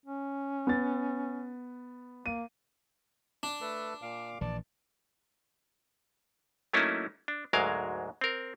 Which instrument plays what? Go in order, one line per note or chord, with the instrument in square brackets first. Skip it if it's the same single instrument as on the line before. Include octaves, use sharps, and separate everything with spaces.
[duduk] C#4
[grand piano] B3 A6
[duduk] A#3 [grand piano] D#7
[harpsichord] D4
[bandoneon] A3 A4 B4
A#2 F5 D6
[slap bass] A#1 E3 [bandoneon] D5 A5
[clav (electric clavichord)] F#3 A3 A#3 C#4 D#4 E4
D4
D2 G#2 F#3 G#3 A#4 F5
C4 A#4